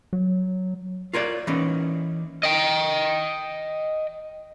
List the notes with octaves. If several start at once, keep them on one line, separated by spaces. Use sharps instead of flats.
F#3
F4 A#4 C#5 D5
E3 A#3 C#4 D#4
D#5 G5